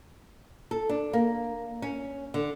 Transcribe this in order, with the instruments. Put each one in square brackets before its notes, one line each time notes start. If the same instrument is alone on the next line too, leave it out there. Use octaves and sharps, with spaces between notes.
[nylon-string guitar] A4
D4
A#3
C#4
D3